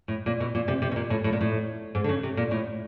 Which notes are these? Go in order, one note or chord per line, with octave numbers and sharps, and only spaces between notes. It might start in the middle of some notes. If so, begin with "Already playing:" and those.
A2
A#2
B2
A#2
C3
C3
B2
A#2
A2
A2
A#2
A2
G#2
D3
C#3
C3
A#2
A2